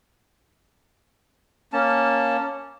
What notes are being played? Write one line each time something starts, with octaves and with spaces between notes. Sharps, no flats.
A#3 C#4 A5